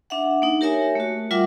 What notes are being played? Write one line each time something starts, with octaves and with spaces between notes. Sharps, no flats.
D4 E5 F#5
A#3 D#4
G4 A#4 C#5 E5 G#5
A3 F#4
G3 F4 A#4 E5 F#5 D6